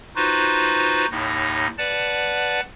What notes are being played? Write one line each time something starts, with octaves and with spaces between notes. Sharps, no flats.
D#4 F4 F#4 B4 C5
D#2 A2 D#4 A#6
B4 D5 F#5 A5